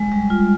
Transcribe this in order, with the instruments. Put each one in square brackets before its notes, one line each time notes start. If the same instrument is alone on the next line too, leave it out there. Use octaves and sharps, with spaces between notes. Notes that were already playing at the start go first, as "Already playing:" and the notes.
Already playing: [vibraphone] G#3
G3
F4